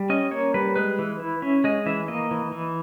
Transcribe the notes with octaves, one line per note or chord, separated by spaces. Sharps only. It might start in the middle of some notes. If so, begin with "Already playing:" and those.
Already playing: G3
C#4 D#5
A#3 C#5
G3 B4
G#3 B4
E3
E4
C#4 E5
G#3 D#5
E3 E5
A#3 D#5
E3
E3